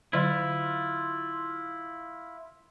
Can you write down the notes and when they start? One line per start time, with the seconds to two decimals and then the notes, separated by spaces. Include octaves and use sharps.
0.13 D3 F#3 E4 F4 D5